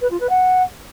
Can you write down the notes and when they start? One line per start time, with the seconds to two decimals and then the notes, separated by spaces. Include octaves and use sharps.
0.01 B4
0.11 F4
0.20 B4
0.30 F#5